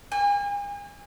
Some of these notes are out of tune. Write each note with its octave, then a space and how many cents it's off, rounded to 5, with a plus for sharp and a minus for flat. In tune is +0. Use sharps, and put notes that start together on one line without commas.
G#5 -40